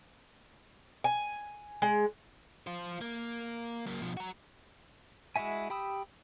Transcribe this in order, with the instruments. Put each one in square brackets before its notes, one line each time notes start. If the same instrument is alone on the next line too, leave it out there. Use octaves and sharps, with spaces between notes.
[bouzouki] G#5
G#3
[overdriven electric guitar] F4 C5
A#3
F#3 A#3
B2 F3
F#4 A#5
[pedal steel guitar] G#3 E4 F#4 E5 G#5
G4 G5 B5 D#6 E6